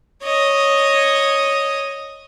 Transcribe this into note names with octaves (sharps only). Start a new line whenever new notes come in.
C#5 D#5